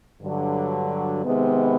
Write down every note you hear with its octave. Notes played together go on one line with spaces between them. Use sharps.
G2 D3 F#3
C3 D#3 G#3 B3